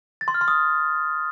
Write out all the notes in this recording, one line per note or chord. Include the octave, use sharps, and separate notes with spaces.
A6
C6
F6
C6
D#6